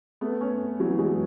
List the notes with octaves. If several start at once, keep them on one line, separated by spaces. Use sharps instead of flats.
A3 B3
B3 C#4
E3 F#3
F#3 G#3